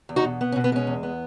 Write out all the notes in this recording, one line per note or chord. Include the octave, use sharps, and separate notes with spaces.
E2
D#4 F#4
B2
B3
C#4
B2
B3
G#3 C#4
E2
B3